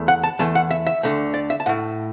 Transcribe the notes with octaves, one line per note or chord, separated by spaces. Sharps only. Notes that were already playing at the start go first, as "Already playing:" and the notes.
Already playing: E2 A3
F#5
A5
E2 E3 A3 A5
F#5
E5
E5
D2 D3 A3
D5
E5
A5
A2 A3 F#5